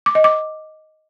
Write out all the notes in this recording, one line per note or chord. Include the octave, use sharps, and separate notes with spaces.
D6
D#5
D6